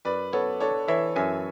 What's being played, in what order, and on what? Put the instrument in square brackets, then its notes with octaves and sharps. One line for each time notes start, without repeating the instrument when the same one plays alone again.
[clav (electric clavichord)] F#2 [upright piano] B4 D5
[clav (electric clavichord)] B3 [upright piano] A4 C#5
[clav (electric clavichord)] D4 [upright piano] A4 C#5
[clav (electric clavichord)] E3 [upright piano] C#5 E5
[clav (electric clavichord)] F#2 [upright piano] E5 G#5